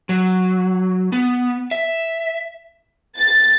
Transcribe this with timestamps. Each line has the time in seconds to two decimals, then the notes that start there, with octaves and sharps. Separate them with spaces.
0.09 F#3
1.12 B3
1.71 E5
3.19 A6